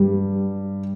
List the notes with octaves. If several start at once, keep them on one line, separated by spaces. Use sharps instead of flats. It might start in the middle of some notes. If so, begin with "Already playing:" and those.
Already playing: G2 G3